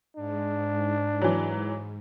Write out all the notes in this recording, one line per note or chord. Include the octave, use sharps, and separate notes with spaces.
G#2 D4
E3 F#3